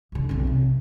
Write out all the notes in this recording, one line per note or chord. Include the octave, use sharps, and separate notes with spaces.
F#1 D3
B1 C4
C3